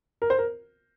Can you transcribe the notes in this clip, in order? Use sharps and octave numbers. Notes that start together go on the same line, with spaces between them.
A#4
C5
A#4